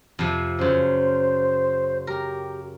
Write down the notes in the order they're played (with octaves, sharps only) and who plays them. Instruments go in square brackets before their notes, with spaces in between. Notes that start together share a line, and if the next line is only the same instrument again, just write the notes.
[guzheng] F2 C3
[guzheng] F#2 C#3 [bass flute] C5
[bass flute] G4 [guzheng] A#4